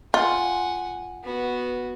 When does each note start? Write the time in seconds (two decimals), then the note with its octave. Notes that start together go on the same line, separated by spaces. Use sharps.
0.14 F4 F#5 G#5
1.24 B3 F#4